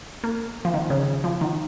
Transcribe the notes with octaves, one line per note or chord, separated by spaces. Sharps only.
A#3
F3
D#3
C#3
F3
D#3